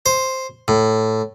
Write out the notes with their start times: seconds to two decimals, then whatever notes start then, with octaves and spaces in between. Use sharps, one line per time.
0.06 C5
0.68 A2